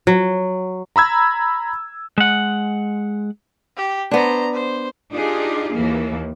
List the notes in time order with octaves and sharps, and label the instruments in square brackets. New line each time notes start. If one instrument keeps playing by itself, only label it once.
[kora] F#3
[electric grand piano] A#5 B5 E6 G#6
[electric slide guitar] G#3 F#5
[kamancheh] G4
[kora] B3 D4 [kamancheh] C5 A#5
[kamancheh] C5
[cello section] D4 D#4 F4 G4 G#4
D#2 E3 A#3